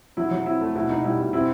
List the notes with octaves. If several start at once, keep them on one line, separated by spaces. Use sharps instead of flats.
F#3 E4
F#3
C4 E4
A3
B2 E4
B2 D#4
G3 E4
B2
C4 E4